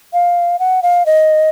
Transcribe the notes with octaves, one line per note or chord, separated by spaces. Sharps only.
F5
F#5
F5
D#5